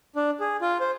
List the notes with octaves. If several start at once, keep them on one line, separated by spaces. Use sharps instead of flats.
D4
G#4
F4
C5